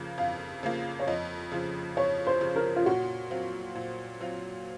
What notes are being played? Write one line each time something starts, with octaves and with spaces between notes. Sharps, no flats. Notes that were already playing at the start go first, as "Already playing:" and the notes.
Already playing: F2 C#3 F3 A#3
F2 F5
C#3 F3 A#3
C#5
F2 D#5
C#3 F3
F2 C#5
C5
C#3 F3
A#4
F4
A#2 F#4
F#3 C4 F4
A#2
F#3 C4 F4